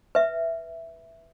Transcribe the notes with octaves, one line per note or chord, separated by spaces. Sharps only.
B4 E5